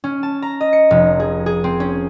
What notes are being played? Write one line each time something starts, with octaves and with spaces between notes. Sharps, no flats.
C#4
A5
A#5
D#5
C#7
F1
G#4
G#4
C4
C#4